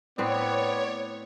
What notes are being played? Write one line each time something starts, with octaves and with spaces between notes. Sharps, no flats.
A2 B3 C4 B4 C#5 D5